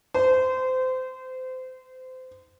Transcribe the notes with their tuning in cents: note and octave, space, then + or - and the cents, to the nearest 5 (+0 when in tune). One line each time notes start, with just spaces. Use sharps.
C5 -25